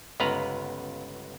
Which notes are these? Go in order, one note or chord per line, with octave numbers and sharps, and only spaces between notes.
G1 C#2 B3 B4 F5 A#5